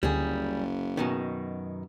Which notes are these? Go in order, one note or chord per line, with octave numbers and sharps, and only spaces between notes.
F#1 D2 D3 G3 G#4
F#2 B2 D#3